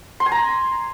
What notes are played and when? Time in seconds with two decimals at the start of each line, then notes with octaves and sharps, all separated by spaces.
0.20 C6
0.26 G#5
0.32 A#5